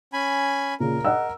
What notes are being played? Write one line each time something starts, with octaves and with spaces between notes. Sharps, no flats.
C#4 G#5 B5
A#2 C#3 A#4
D#5 F#5 E6